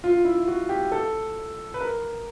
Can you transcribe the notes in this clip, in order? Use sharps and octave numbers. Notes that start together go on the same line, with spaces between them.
F4
E4
F#4
G4
A4
B4
A#4